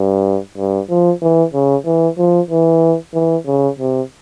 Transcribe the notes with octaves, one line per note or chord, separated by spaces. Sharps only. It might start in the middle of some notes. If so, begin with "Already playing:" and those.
Already playing: G2
G2
F3
E3
C#3
E3
F3
E3
E3
C#3
C3